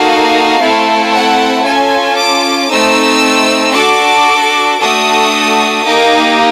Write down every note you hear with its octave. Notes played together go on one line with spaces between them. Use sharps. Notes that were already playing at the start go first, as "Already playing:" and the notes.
Already playing: A#3 D#4 F#4 A4 F5
A3 C4 E4 A4
F#5
C#4 F4 A4 G#5
D6
A3 C4 D#4 E6
D4 F#4 A4 D6
A3 D4 F#4 A4 D#6
A#3 D#4 G4 D6